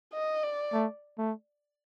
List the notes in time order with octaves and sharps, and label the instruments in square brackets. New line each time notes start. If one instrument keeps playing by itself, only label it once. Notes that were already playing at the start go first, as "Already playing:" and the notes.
[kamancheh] D#5
D5
[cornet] A3
A3